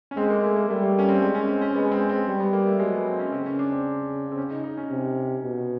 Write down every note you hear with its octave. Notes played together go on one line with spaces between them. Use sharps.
C#4
G#3 C4
A#3
A3
A#3
G3 A3
A#3
C#4
C4
G#3 C4
C#4
C4
C#4
G#3 B3
C4
C4
G3
B3
A#3
A3
F#3 G#3
B3
C4
C#4
C#3 C4
C#4
D4
C4
C4
C#4
D#4
D#4
C#4
C3
B2